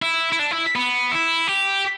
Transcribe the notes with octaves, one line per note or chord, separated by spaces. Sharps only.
E4
E4
D4
E4
B3
E4
G4